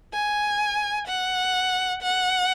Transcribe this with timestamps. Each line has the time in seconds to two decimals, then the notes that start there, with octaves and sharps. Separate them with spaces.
0.13 G#5
1.08 F#5
2.02 F#5